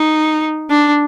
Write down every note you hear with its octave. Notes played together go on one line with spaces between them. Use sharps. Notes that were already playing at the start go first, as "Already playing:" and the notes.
Already playing: D#4
D4